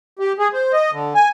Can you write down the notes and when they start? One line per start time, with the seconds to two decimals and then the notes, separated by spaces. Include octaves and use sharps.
0.19 G4
0.39 G#4
0.53 C5
0.73 D#5
0.92 D3
1.15 G#5